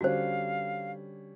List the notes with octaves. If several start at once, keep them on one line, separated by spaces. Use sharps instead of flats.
D3 G3 C#4 F#4 C5 F5